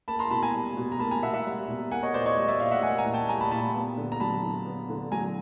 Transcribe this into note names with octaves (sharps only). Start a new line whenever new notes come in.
A#3 A5 B5
A#5 C6
B2 A5 B5
G#5 A#5
G3
B2
A#5
A#3 A5 B5
G#5 A#5
B2 E5 F#5
E5 F#5
G3
B2
A#3 F#5 G#5
C#5 D#5
A#2 C5 D5
C#5 D#5
G3
D5 E5
A#2 D#5 F5
E5 F#5
A#3 F#5 G#5
G#5 A#5
A#2
G5 A5
G3 G#5 A#5
A5 B5
A#2 A5 B5
B3
D3
A#5
F#3 A5 B5
D3
B3
D3
F#3 G#5 A#5